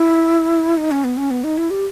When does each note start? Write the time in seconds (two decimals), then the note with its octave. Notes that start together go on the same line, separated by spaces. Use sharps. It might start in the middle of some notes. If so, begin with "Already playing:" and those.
Already playing: E4
0.77 D#4
0.91 C#4
1.04 B3
1.17 C#4
1.31 B3
1.44 D#4
1.58 E4
1.70 G4